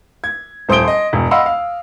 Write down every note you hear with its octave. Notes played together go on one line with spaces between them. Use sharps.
G#6
D#1 C5 C6 D#6 D7 G7
D#5 C6
E1
D#5 F5 F#5 B5 C6 E6
F5